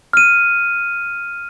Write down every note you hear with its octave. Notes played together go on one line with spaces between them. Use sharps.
F6 D#7